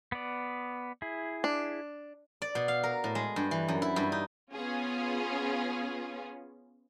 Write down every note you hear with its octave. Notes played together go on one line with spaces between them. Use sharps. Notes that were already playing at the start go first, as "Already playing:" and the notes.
B3 D5
E4 G#4
D4
D5
B2
F5
A#4
A2
G#3
G2
E3
F#2
E4
G2
D#4
B3 C#4 F4 G#4